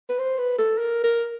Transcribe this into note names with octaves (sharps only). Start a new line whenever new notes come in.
B4
C5
B4
A4
A#4
A#4